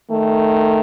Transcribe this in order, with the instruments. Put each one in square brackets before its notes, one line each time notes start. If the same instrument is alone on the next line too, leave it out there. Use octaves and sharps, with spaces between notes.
[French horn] D#3 [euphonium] A3